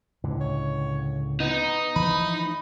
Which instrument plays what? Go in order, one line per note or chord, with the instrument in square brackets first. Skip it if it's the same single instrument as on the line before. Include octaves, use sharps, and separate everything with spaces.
[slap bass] C#2 A2 D3
[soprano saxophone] C#5
[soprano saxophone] B3 [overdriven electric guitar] D#4
[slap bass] E3 F3 A3 [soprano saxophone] B5